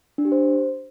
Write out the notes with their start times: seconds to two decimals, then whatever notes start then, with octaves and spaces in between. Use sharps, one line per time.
0.18 D4
0.25 G4
0.32 C5